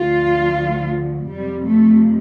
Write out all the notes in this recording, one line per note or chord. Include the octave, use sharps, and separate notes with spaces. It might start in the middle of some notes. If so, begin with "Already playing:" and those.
Already playing: D2 D3 F3 F4
F2 C3 F3 G3
A3